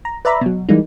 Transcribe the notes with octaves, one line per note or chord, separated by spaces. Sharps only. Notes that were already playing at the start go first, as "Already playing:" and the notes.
A#5
B4 D5 E5 A#5 B5
B2 F#3
E3 G3 G#3 A#3 D#4